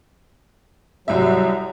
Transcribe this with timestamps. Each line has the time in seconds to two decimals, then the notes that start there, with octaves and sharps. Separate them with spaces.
1.08 C2 F#3 G3 E5